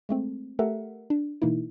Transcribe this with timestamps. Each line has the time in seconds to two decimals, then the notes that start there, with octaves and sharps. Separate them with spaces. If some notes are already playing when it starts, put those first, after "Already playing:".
0.09 G#3 A3 C4
0.59 A3 G4 A4 A#4 E5 F#5
1.10 D4
1.42 B2 E3 A#3 D#4 E4